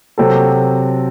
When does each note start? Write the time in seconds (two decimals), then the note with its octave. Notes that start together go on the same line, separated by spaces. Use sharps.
0.18 C3 F#3 C4 F#4 A4